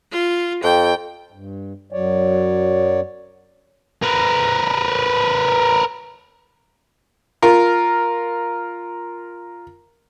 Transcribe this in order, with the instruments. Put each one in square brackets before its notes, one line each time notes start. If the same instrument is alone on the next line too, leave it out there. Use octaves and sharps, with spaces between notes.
[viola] F4
[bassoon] F2 [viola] G5
[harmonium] G2
F#2 F#3 C#5 D5
[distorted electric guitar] A#4 B4
[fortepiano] F4 A#4